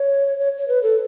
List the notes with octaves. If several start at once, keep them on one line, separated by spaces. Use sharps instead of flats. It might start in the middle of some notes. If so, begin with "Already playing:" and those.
Already playing: C#5
C#5
C#5
B4
A4